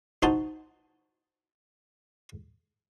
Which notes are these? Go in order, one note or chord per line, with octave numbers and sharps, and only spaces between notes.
D#4 F#4 C5 A5